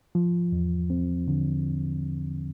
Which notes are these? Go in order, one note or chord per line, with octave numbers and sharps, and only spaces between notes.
F3
E2
C4
D3